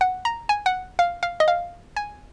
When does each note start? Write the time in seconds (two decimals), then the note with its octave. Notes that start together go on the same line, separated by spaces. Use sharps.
0.01 F#5
0.25 A#5
0.49 G#5
0.66 F#5
0.99 F5
1.23 F5
1.40 D#5
1.48 F5
1.96 G#5